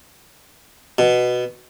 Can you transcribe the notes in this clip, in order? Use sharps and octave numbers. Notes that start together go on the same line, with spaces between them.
B2